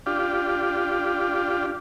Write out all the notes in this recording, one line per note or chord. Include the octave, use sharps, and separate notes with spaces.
D4 F4 G4